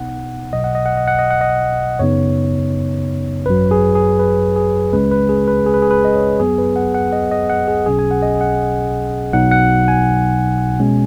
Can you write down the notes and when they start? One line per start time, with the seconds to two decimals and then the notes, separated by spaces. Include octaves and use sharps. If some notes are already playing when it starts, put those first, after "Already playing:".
Already playing: B1 B2 B3 D#4 F#5
0.53 B1 B2 F#3 D#5
0.64 F#5
0.75 D#5
0.86 F#5
0.97 D#5
1.07 F#5
1.19 D#5
1.31 F#5
1.41 D#5
1.99 F#2 C#3 B3 D#4 C#5
3.46 G#1 F#2 F#3 B4
3.71 G#4
3.95 G#4
4.19 B4
4.56 G#4
4.93 C#2 C#3 G#3 C#4 B4
5.11 B4
5.29 G#4
5.48 B4
5.66 G#4
5.74 B4
5.82 G#4
5.91 B4
6.05 D#5
6.15 C#5
6.40 F#2 F#3 B3 G#4
6.58 B4
6.76 F#5
6.94 F#5
7.13 D#5
7.31 D#5
7.49 F#5
7.68 G#4
7.86 B1 B2 F#3 C#4 G#4
7.99 G#5
8.11 F#5
8.22 D#5
8.41 F#5
9.33 B1 B2 F#3 D#4 F#5
9.51 F#5
9.88 G#5
10.80 B2 G#3 C#4